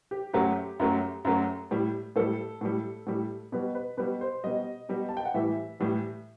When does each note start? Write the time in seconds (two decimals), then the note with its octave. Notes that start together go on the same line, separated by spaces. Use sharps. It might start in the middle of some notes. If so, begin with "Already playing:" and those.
0.11 G4
0.33 F#2 F#3 A3 G4
0.80 F#2 F#3 A3
1.25 F#2 F#3 A3
1.71 A2 G3
2.16 A2 G3 A4
2.61 A2 G3
3.07 A2 G3
3.52 B2 G3 B4
3.75 B4
3.97 B2 G3 B4
4.21 C5
4.44 B2 G3 D#5
4.89 B2 G3
5.09 A5
5.17 G5
5.25 F#5
5.34 A2 E3 G3 E5
5.80 A2 E3 G3